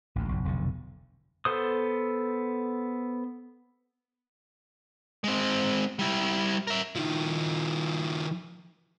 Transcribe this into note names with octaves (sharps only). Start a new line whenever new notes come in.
A1 D2
F#1 B1
F1 B1 E2 D3
B3 A4 C5 D#6
G#3 C4
G3 E4
A#4 E5
D#3 F3